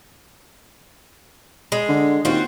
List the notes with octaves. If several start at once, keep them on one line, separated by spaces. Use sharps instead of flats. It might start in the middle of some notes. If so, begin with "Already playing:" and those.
G#3
D3
D#2 C4 F4 F#4